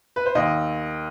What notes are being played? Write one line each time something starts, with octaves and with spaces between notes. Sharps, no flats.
B4
C5
D#2 D#5